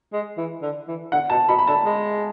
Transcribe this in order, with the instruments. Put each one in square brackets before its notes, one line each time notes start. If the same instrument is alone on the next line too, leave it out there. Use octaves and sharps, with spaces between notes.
[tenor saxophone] G#3
E3
D3
E3
[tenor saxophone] D3 [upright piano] F#5
[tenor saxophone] B2 [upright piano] A5
[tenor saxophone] B2 [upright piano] B5
[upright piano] B5
[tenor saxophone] D3 [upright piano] A5
[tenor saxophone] G#3